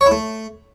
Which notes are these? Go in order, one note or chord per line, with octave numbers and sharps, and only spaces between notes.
C#5
E4
A3